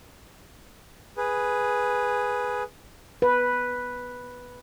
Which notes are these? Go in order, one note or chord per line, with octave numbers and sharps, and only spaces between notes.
G#4 B4
B4